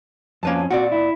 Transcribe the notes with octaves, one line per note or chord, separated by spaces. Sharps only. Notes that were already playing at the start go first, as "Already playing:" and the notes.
F2 A#3 C#4 B4 A5
A#2 C4 F#4 D5
E4